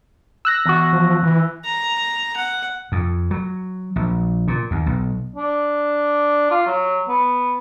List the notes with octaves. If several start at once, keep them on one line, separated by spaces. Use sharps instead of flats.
E6 F#6 A#6
E2 F#4
F3
E3
A#5
F#5
F2
F#3
A#1
A#2
D#2
B1
D4
F4
F#3
B3